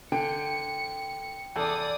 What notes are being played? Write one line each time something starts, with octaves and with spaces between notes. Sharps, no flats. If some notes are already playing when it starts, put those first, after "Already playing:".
D3 G5 C#7
E2 A4 D5 D#6